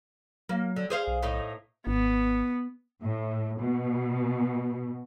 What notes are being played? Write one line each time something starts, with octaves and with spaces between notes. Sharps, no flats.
F#3 A#3
D3
G#4 C5 F5
B1
A2 D#4 D#5
G#1 B3
A2
B2